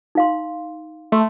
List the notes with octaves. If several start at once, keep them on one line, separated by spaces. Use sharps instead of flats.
D#4 F5 C6
A3 C6